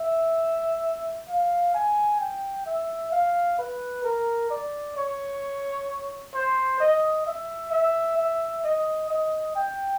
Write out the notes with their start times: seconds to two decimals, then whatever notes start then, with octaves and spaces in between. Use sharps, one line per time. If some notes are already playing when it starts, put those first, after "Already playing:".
Already playing: E5
1.29 F5
1.75 G#5
2.21 G5
2.66 E5
3.12 F5
3.58 B4
4.04 A#4
4.50 D5
4.97 C#5
6.34 C5
6.80 D#5
7.27 E5
7.72 E5
8.18 E5
8.64 D#5
9.10 D#5
9.56 G5